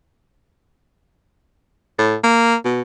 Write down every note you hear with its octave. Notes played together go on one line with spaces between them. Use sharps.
A2
A#3
B2